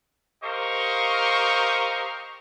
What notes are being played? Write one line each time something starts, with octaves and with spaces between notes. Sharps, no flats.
G4 A#4 C5 D#5 F5 C#6